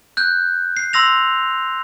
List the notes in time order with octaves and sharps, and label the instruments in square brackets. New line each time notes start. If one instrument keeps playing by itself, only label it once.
[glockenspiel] F#6 G6
C7
C6 E6 A#6 F7